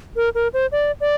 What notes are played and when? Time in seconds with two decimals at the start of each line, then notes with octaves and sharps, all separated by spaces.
0.16 A#4
0.35 A#4
0.53 C5
0.72 D5
1.01 D5